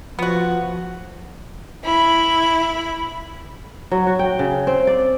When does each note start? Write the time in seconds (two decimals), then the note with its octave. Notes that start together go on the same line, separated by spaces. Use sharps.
0.19 F3 B3 F#4
1.83 E4 B5
3.91 F#3
4.07 F#4
4.19 G5
4.39 C#3
4.67 C4
4.87 D5